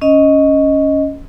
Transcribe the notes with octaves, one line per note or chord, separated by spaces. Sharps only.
C#4 D#5